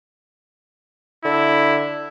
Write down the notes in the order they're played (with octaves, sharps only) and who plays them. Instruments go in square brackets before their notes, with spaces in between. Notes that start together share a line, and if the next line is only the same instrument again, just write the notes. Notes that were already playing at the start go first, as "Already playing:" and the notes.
[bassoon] D3 [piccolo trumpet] E4